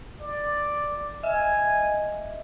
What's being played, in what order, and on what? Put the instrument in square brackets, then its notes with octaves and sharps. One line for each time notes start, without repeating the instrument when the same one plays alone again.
[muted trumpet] D5
[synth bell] D#5 E5 [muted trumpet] G#5